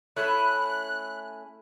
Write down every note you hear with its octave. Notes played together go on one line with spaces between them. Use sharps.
A3 C#4 E4 G#5 B5 F#6